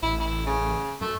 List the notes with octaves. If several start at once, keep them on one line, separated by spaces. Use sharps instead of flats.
A1 E4
E4
C#3
F#2 A3